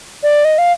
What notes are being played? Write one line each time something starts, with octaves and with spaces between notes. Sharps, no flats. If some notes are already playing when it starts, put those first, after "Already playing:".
D5
D#5
F5